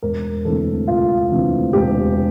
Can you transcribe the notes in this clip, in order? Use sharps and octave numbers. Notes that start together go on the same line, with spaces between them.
E1 A#4
D2 C3 E3 A4
E1 F4
D2 C3 E3
E1 G4